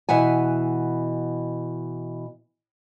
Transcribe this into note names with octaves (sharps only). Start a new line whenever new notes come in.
B2 E3 F#5 G#5